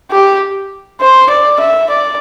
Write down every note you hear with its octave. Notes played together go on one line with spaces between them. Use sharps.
G4
C5
D5
E5
D5